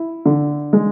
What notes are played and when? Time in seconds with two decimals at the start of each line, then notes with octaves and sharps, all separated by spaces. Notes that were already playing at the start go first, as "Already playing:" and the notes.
Already playing: E4
0.26 D3
0.73 G#3